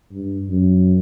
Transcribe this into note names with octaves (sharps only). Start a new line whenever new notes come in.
G2
F#2